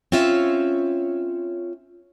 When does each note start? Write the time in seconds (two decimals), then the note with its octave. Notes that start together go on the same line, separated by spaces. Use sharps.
0.12 C4 C#4 F4 C#5 E5